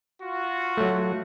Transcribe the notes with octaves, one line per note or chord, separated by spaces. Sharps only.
F4 F#4
F#3 A3